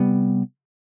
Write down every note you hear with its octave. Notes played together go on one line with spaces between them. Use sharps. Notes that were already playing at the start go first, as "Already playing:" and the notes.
Already playing: C3 G3 B3